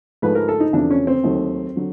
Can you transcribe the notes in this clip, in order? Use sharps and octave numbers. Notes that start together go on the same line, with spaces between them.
G#2 F3 A3 B4
A#4
A4
D#4
E2 C3 F3 A3 D4
C#4
C4
D#2 D#3 F#3 A3
D3 F#3